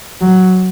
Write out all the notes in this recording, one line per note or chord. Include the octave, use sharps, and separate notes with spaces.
F#3